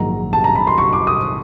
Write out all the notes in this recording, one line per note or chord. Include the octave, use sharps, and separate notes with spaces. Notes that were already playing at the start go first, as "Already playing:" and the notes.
Already playing: A#1 G#2 D#3 F#3 A#3 A#5
A5
A#5
B5
C6
C#6
D6
D#6